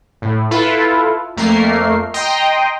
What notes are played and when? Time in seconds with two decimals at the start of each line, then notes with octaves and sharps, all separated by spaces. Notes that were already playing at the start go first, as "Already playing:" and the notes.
0.22 A2
0.51 E4 F4 A4 B4
1.37 F2 A3 A#3 A#4 C7
2.14 D#5 G5 A#5 C6